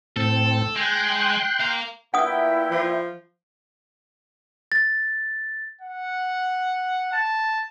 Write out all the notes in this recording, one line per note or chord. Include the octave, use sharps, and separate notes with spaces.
A2 C4 A4
G#3 G5 C6 F#6
F5 A#5
A#2 B3 E4 F#5 G5 D#6
F3
A6
F#5
A5